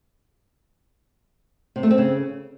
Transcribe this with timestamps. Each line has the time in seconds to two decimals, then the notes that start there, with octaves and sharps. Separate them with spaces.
1.76 C3
1.83 A3
1.90 C4
1.98 C#3